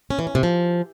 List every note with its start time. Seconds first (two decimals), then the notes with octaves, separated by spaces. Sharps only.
0.10 C#4
0.19 E3
0.27 C#4
0.35 C3
0.43 F3